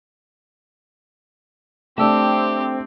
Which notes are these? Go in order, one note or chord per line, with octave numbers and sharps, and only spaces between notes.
A3 C4 D4 G4 A5 E6